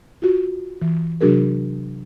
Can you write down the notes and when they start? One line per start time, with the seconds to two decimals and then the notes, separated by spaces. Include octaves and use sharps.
0.22 F4 F#4
0.82 E3
1.21 C3 F#3 D4 F#4 G#4 A#4